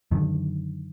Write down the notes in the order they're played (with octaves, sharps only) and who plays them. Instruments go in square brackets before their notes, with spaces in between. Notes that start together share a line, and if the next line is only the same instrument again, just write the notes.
[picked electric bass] F#2 D3 D#3